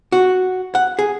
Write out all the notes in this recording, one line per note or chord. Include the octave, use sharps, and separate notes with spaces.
F#4
F#5
G#4